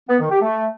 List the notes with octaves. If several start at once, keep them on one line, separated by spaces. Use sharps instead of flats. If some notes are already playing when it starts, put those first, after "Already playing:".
B3
D#3
G4
A3